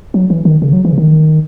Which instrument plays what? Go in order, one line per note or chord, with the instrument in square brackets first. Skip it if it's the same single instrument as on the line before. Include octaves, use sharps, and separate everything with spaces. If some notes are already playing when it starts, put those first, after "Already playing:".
[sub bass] F#3
E3
D#3
C#3
F#3
E3
C#3
D#3